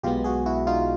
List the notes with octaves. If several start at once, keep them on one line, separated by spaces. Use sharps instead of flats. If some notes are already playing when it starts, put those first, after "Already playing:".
B1 B2 G#3 B3 F4 G4
F#4 G#4
E4 F#4
D#4 F4